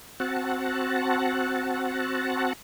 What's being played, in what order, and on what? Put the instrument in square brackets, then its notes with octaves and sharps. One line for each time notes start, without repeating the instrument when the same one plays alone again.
[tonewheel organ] C4 F#4 F#5 A5